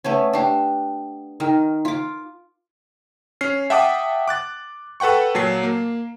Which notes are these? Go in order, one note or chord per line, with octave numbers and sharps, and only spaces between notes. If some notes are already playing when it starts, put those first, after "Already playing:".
A3 B3 C#4
D4 G4
D#3 A#4
F4 D6
C#4 F6 C7
E5 F#5 G5 A5 D6 D#6
D6 F#6 A6
A4 B4 F#5 G5 C#6
A#2 F#3 A5 C7
A#3